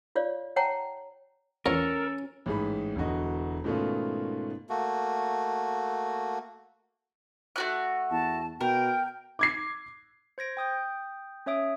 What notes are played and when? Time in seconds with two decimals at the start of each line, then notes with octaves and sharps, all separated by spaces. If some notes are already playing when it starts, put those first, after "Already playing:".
0.15 F4 C#5 D5 F5
0.56 C#5 F#5 G5 A5 A#5
1.66 E2 C#4 F4 A4 A#4 C#5
2.46 A1 G#2 G#4 B5
2.96 E1 E2 D3 F#4 D#5
3.64 G#2 B2 D#3 A3 C#4 F4
4.69 A3 A#3 F#4
7.56 A3 F#4 F#6
8.11 E2 A5
8.61 B2 A#4 G5
9.39 D6 G#6 C7
10.38 C5 G#6 A#6 D7
10.57 G5 D#6 G6
11.46 C#4 C#5 E5 D#6 D7